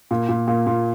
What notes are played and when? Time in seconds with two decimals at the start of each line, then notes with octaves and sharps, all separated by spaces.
0.11 A#2
0.29 A#2
0.47 A#2
0.67 A#2